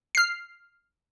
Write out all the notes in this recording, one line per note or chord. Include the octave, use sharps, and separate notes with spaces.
F6 C7